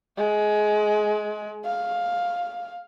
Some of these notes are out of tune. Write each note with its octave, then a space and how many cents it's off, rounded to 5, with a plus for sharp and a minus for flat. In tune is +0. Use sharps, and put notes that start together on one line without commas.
G#3 +20
F5 +10